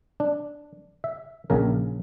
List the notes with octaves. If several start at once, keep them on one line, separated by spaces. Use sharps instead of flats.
D4
E5
A#1 C#3 A#4